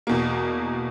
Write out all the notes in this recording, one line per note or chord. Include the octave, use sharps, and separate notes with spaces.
E2 B2 A#3